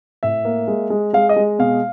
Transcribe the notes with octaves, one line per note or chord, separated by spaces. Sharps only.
A2 E5
A#3
G#3
G#3
G#3 F5
D#5
G#3
B2 F5